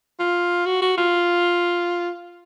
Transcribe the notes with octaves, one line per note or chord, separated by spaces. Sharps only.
F4
F#4
F#4
F4